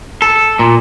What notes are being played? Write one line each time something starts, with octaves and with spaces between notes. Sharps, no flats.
A4
A#2